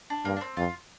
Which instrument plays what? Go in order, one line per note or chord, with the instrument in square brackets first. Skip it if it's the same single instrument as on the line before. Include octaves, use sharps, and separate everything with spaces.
[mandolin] D4
[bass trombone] G2 [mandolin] A#3
[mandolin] D4
C4
[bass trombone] F2 [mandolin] F4